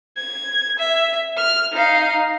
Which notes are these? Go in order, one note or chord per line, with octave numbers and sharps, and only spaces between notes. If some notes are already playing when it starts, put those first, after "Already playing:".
G#6
E5
F6
D#4 F5